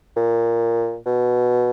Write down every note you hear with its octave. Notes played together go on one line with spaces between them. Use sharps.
A#2
B2